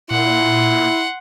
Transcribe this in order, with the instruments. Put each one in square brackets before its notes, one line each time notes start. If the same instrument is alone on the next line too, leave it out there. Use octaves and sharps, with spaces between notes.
[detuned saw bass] A#2 [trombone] E4 [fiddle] F#5 C6